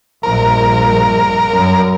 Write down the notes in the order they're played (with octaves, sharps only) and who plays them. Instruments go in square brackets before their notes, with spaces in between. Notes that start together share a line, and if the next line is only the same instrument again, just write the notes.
[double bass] A#1 G2 [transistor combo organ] A#4
[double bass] F#2